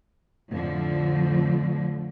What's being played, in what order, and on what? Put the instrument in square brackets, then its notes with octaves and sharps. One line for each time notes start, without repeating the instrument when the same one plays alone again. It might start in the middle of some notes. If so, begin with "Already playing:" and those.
[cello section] F2 A2 D3 F3